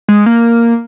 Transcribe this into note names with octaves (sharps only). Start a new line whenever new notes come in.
G#3
A#3